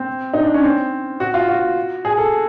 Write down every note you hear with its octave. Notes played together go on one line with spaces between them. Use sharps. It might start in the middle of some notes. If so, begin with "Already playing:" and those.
Already playing: C4
D#4
D4
C#4
C4
F#4
F4
F#4
G#4
A4